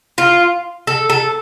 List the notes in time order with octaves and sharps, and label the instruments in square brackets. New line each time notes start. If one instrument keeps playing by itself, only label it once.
[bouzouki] F4
A4
A4